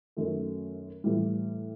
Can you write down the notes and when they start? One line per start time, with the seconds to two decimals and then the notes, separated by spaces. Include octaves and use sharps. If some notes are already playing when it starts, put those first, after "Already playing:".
0.17 F#2 D#3 A3
1.04 A2 E3 G3